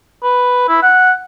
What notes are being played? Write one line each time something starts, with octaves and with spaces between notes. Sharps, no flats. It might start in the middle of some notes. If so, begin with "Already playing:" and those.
B4
E4
F#5